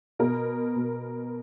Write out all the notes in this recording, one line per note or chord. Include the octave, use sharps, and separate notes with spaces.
B2 A#4
B2